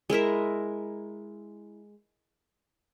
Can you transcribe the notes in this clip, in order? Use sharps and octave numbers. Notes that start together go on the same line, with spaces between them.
G#3 E4 A#4 E5